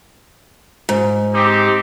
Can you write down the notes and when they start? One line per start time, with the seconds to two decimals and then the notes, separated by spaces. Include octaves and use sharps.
0.89 G#2
1.34 C4 D#4 G4